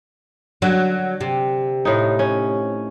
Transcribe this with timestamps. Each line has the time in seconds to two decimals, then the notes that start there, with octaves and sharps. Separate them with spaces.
0.62 D3 F#3
1.21 C3
1.85 A2 D#4
2.19 C#4